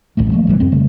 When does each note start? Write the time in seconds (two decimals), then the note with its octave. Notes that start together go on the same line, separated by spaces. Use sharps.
0.17 D#1 A1 E2 A3
0.32 F3 A3 A#3
0.47 G#1 C3 E3 G3
0.60 F2 C4
0.72 C#3 A3